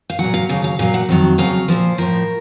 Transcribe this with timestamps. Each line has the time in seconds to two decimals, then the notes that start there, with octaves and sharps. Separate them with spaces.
0.10 F5
0.19 A#2 F#3 F#5
0.34 F5
0.49 D#2 C#3 F#3 F5
0.64 F5
0.79 A#2 F#3 F5
0.94 F#5
1.09 F2 D#3 F#3
1.38 F2 C#3 F#3 F5
1.68 A#2 F3 C5
1.98 A2 F3 A#4